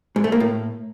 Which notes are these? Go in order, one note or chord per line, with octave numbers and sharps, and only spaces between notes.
G#2
A3
A#3
A2